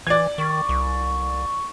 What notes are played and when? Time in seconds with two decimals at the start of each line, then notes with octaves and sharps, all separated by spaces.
0.07 E3 D5 G#6
0.38 D#3 C#6
0.69 C2